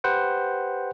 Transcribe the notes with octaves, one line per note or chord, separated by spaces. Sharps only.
G4 B4 C5 F#5 G5